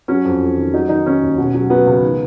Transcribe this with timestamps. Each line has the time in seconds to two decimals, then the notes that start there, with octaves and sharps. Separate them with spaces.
0.08 F#3 C#4
0.24 F2
0.42 F2
0.58 D#3
0.73 F#3 D#4
0.89 D#3 D#4
1.06 D#3 C#4
1.22 D#2
1.38 B2
1.54 F#3
1.70 F#3 B3
1.86 C#2
2.02 D#3